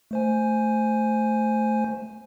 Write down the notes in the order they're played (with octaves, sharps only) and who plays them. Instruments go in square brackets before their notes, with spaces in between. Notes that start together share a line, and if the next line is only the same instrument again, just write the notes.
[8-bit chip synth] A3 C5 G#5